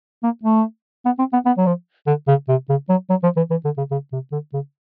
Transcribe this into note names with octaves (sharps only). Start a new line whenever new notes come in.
A#3
A3
B3
C4
B3
B3
F#3
F3
D3
C#3
C3
C#3
F#3
F#3
F3
E3
E3
D3
C#3
C#3
C3
D3
C#3